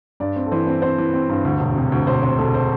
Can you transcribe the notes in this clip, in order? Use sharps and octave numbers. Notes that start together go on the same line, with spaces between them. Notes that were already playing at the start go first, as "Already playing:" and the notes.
G2 D5
C4
A4
E3 C5
C4
C4 C5
E3
C4
G2
D2
E1
C3
D2
E1 C5
C3 C5
E1 A4
C5